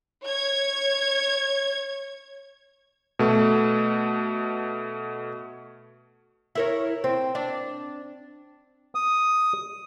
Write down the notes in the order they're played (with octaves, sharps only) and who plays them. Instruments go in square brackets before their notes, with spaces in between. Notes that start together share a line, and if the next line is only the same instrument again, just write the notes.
[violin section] C#5 G#6
[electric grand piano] B2 A3
[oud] E4 A#4 C#5
C4
D4
[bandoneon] D#6